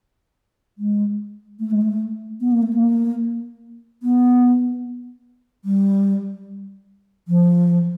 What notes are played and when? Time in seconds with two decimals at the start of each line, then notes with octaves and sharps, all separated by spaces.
0.78 G#3
1.60 A3
1.71 G#3
1.82 A3
2.41 B3
2.52 A#3
2.63 A3
2.73 A#3
4.03 B3
5.65 G3
7.28 F3